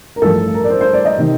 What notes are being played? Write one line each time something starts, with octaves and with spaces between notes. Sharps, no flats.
A#4
A1 G2 F3 A4
A#4
D5
C5
C5
D5
D#5
C3 D#3